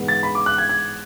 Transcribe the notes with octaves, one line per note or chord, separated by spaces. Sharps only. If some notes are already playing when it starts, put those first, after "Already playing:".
Already playing: G#2 E3 G#3 B3
A6
B5
D6
F#6
G#6
G#6